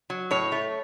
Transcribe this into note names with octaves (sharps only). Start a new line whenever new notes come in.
F#3
A2 C#5
A3